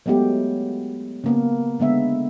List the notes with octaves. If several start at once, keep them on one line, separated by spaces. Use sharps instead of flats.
F#3 G#3 A3 B3 G4
C#3 A#3 B3
D3 G#3 B3 E5